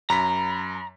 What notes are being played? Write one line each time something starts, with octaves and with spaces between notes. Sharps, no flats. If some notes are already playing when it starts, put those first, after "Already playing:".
F#2 A#5 B5 B6